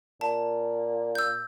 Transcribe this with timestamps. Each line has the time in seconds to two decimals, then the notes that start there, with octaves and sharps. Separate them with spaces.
0.21 A#2 A5
1.15 E6 G6